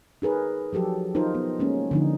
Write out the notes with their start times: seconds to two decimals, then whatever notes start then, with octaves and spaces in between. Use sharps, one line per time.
0.22 D#4 G#4 A#4 B4
0.73 F3 F#3 G4 A4
1.15 D#4 F4 A#4 C5
1.35 B3
1.60 G#3 A#3 C#4
1.91 D3 F3 D#4